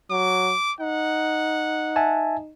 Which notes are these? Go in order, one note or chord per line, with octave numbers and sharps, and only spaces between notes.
F#3 D6
D#4 F#5
E5 G#5 A5